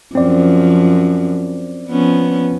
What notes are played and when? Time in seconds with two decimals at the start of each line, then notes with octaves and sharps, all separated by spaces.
0.15 F#2 F3 C4 D5
1.88 F3 B3 C#4